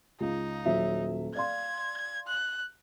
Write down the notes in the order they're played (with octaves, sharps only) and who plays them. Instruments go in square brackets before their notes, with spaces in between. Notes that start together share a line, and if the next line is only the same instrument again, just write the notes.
[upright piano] C#2 [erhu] D#4
[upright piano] D#1 F#3 E5
[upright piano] D5 F5 C6 [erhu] G#6
[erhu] F#6